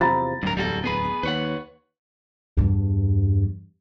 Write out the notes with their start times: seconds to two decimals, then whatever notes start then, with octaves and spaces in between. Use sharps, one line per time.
0.01 E2 C3 F3 A#5 B5 A6
0.43 D1 G2 A#4
0.57 D1 E2 G3 F#4 A4
0.84 B3 G#4 B4
1.23 D#2 B4 C#5 F#5
2.57 E2 G2